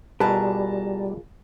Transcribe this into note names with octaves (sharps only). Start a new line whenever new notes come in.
B2 G3 F4 G#4 A#4 B4 A5 A#5